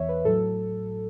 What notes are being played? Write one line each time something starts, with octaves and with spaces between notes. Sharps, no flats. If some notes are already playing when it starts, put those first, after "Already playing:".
Already playing: E2 E3 C#5 E5
B4
A2 F#3 A4